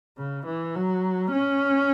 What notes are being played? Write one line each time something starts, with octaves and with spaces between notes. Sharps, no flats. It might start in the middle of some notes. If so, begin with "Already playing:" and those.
C#3
E3
F#3
C#4